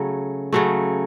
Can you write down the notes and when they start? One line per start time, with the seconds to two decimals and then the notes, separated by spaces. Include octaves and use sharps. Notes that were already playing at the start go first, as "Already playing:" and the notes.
Already playing: C#3 F#3 A3
0.53 C#3 F#3 A3